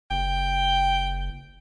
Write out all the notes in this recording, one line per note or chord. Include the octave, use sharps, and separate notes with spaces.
F#1 G5